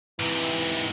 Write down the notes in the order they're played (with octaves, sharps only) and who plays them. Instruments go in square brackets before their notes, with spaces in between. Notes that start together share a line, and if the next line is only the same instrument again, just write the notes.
[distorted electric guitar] G#2 C3 [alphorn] E3